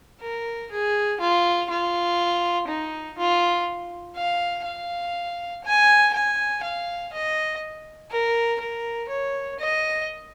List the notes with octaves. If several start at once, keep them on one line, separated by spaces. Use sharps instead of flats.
A#4
G#4
F4
F4
D#4
F4
F5
F5
G#5
G#5
F5
D#5
A#4
A#4
C#5
D#5